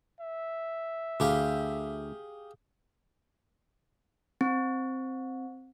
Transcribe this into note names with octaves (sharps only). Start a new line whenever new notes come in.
E5
D2 G4 G#4 F5
C4